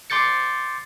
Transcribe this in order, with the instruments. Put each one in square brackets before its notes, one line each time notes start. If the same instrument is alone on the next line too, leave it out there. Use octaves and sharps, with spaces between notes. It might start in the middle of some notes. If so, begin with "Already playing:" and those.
[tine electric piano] C6 D6 G6 A6 C#7